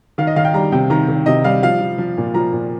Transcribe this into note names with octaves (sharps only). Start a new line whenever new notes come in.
D#3 F5
D#5
D#3 F5
G5
G3 A#5
C3 G5
D#3 A#5
D#3
C3 D#5
G3 F5
F3 F5
F3
F3
A#2
F3 A#5
A#2